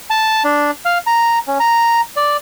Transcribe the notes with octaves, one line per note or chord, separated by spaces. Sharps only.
A5
D4
F5
A#5
C#4
A#5
D5